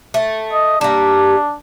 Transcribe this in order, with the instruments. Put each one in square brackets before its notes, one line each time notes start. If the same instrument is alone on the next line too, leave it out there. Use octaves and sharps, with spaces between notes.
[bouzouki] A3
[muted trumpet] D#5
[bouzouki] G3 A#3 [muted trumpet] D4